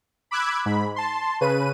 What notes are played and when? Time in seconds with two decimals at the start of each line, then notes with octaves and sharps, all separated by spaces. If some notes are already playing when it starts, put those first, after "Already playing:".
0.31 B5 D6 E6 F#6 G#6
0.65 G#2 B5
0.96 A5 C6
1.41 C#3 B4 D#7